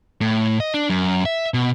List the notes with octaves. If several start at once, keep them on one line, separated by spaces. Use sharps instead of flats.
A2
D#5
D4
F#2
E5
B2